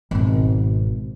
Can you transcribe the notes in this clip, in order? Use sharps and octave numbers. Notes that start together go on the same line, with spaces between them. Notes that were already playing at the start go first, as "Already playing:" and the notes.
G#1 B2